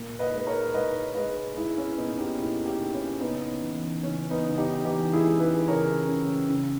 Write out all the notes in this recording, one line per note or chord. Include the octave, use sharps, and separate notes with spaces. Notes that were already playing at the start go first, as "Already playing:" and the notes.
Already playing: A#2
B4 D#5
G#3 B4
A#4 C#5
G#3 B4 D#5
G#3 B4 D#5
G#3 E4 G#4
C#4 E4
A#2 B3 D#4
D#4 G4
A#2 E4 G#4
D#4 G4
A#2
C#4 E4
C#3 B3 D#4
E3
C#3 C#4
B3 D#4
C#3
D#4 G4
E3 D#4 G4
E4 G#4
G#3
G#4 B4
C#3 A#4 C#5
C#3
C#3